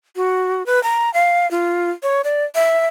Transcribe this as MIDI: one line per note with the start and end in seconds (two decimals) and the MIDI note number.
0.16 0.65 66
0.66 0.82 71
0.83 1.12 82
1.14 1.49 77
1.51 1.90 65
2.03 2.22 73
2.24 2.44 74
2.55 2.87 76